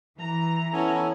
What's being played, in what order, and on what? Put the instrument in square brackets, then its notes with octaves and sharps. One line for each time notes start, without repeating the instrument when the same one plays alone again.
[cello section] E3 [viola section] A#5
[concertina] B3 A4 G#5 [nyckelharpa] C#4 E4